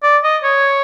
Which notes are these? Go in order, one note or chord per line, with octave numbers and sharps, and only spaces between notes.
D5
D#5
C#5